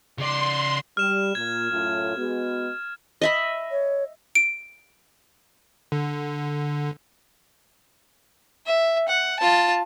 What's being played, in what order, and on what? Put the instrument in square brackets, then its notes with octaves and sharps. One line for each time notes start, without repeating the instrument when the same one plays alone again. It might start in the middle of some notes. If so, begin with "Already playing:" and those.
[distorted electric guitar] C#3 D5 [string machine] C6
[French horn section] G3 [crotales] F6 E7
[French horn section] A#2 [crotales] G#6
[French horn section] F#2 A2 F4
G#3 B3 F#4
[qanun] D#5 E5 B5
[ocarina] C#5
[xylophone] D7
[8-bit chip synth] D3
[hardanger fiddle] E5
F#5
F4 A5